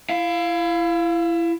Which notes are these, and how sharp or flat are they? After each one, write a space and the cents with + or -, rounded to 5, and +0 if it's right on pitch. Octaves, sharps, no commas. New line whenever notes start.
E4 +25 F5 +0